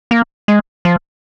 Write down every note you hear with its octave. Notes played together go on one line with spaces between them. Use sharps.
A#3
G#3
F3